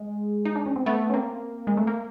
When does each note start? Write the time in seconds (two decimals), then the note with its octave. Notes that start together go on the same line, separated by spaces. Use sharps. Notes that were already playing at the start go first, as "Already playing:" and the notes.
Already playing: G#3
0.45 D#4
0.56 D4
0.66 C#4
0.76 C4
0.86 A3 B3
1.10 C#4
1.13 A#3 C4
1.67 G#3
1.77 A3
1.87 A#3